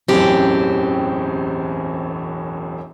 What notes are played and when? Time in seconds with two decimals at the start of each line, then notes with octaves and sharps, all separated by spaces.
0.08 E1 A1 F#2 C4 G4